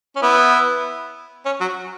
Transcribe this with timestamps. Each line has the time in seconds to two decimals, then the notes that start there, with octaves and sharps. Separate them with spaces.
0.16 C#4
0.22 B3 E4
1.45 C#4
1.61 F#3